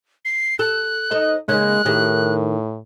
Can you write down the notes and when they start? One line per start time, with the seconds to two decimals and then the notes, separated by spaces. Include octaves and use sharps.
0.25 C7
0.59 A4 F#6
1.11 D#4 A4 C5 D#5
1.48 C#3 G#3 A#3 D#4 F#6
1.85 A2 D#3 G4 G#4